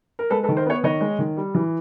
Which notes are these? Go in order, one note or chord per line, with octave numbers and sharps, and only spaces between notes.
A#4
G#3 A4 B4
A4 B4
D#3
A#4 C5
B3 B4 C#5
D#3 C#5 D#5
G#3
D#3
G3
E3